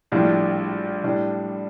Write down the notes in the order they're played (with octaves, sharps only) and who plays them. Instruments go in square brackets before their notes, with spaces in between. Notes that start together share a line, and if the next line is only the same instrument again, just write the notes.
[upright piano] A#1 A2 G3 D4
A2 G3 D4